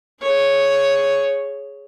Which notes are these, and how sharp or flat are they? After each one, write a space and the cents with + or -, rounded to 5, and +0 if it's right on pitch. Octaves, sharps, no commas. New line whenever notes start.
G#4 +0 C#5 +0